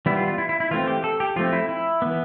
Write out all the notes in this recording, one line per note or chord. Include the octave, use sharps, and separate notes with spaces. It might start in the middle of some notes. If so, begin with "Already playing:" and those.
E3 G3 B3 E4
F4
F4
E4
E4
E4
E3 A3 C4 F4
G4
A4
G4
F3 A3 C4 F4
E4
E4
E3 B3